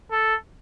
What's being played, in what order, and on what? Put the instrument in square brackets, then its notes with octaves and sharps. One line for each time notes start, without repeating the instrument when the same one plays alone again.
[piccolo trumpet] A4